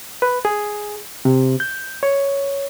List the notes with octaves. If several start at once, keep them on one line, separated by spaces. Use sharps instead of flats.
B4
G#4
C3
G6
C#5